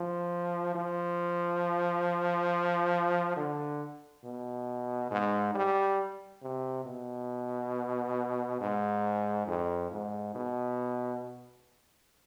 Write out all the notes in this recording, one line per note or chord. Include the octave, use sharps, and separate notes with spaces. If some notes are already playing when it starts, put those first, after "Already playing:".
Already playing: F3
F3
D3
B2
G#2
G3
C3
B2
G#2
F2
G#2
B2